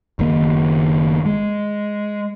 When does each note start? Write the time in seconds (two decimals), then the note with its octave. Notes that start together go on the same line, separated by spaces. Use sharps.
0.19 F#1 D#3 A#3
1.26 G#3